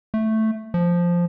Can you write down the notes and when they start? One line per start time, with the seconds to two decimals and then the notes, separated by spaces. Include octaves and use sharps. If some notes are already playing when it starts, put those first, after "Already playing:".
0.14 A3
0.74 F3